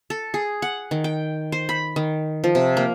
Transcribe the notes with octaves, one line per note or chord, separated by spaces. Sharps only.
A4
G#4
F#5
D#3
G5
C5
B5
D#3
F3
C3
A#3